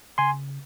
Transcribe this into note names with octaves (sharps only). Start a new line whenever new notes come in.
C#3 G#5 C6